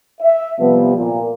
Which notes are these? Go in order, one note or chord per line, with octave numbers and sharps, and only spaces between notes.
E5
C3 F3 G3 B3
A#2